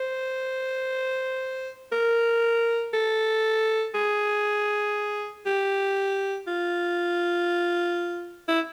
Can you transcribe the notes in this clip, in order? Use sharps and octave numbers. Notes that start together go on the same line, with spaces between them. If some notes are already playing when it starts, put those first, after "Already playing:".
Already playing: C5
A#4
A4
G#4
G4
F4
E4